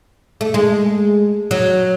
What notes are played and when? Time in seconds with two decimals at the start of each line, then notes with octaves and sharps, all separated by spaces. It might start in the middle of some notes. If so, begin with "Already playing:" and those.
0.41 A3
0.54 G#3
1.51 F#3